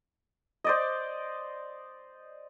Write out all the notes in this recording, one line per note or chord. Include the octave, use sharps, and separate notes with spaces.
C5 D5 D#5